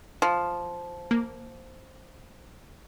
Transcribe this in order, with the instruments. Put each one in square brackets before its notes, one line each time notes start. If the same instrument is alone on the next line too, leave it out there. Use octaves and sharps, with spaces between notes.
[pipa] F3
[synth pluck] A#3